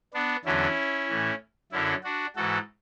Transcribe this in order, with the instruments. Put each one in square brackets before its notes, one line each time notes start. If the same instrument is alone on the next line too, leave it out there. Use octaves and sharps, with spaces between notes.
[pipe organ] B3 D4
E2 D3 F#3 C#4 E4
A2 E3
F#2 D3 F#3 C#4 E4
D4 F#4
G#2 E3 F#4 A4